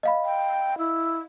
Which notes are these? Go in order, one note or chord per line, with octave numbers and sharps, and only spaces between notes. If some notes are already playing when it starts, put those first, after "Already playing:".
D#5 F5 B5
G5
E4